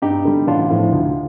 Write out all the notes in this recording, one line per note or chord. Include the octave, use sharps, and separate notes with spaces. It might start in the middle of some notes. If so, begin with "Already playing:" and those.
G2 D#4 G4
D3 G3
A1 D4 F4
A2 F3
D2